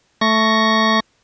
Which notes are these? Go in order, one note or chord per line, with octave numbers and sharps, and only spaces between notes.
A3 C#6 A#6